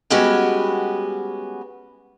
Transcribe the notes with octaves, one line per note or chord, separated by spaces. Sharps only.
G3 G#3 B3 C#4 F#4 G4